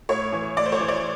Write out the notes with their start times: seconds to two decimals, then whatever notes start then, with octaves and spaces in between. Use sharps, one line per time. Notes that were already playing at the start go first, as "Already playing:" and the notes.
0.09 A2 C#5
0.33 E3
0.57 A2 D5
0.66 C5
0.72 C#5
0.81 E3
0.88 D5